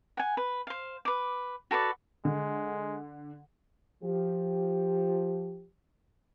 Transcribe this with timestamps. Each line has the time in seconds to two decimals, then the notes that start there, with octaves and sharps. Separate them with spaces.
0.17 F#5 G#5
0.37 B4
0.67 C5 F5
1.05 B4 D6
1.71 F#4 A4 B4 D5
2.25 D3 G#3
4.04 F3 G4